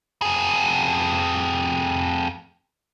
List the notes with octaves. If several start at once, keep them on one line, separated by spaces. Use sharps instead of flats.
F2 G#4